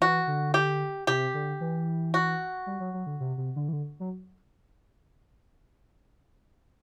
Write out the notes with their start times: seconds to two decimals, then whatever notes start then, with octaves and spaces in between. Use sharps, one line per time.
0.01 E3 F#4
0.27 D3
0.54 G4
1.07 C3 G4
1.34 D3
1.61 E3
2.14 F#4
2.66 G3
2.80 F#3
2.94 F#3
3.06 D3
3.20 C3
3.38 C3
3.56 D3
3.69 E3
3.73 D3
4.00 F#3